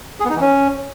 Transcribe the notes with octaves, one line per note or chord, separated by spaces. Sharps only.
G#4
B3
D#4
E3
C#4